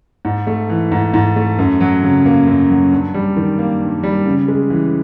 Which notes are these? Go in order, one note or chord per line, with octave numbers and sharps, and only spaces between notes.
G#2
A3
E3
G#2
G#2
A3
F#2
F#3
C#3
A#3
F#2
F#3
G2
G3
D#3
A#3
G2
G3
C#3
G#3
E3